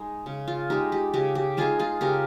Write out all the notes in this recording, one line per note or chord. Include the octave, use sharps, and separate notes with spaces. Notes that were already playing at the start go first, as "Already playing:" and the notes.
Already playing: G#3 D#4
C#3
F4
G#3 D#4 G4
G4
C#3 G4
G4
G#3 D#4 F4 G#4
F4 G#4
C#3 G4 A#4